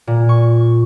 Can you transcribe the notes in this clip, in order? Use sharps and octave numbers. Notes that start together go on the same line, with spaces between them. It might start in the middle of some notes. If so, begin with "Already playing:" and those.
A#2
C#6